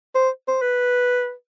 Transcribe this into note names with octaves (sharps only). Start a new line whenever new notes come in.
C5
C5
B4